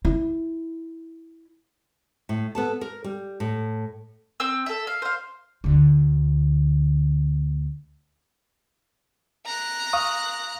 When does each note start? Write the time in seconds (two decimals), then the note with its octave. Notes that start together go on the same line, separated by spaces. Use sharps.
0.05 E4
2.29 A2
2.55 B3 A4 A5
2.81 A#4
3.04 G3
3.40 A2
4.40 C4 E6
4.66 A4 E5
4.87 F5
5.02 C5 F5
5.64 D2 D3
9.46 A#5 F#6
9.93 F5 C#6 D#6